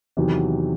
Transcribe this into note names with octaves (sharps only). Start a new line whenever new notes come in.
E2 C3 D#3 F#3